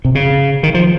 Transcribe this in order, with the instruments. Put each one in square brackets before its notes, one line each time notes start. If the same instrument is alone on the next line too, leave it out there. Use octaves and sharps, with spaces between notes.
[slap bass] C3
C#3
D#3
F3